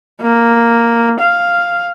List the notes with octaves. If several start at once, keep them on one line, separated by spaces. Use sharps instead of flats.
A#3
F5